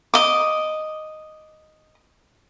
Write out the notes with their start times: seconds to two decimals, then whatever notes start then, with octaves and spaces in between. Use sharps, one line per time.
0.14 D#5 D6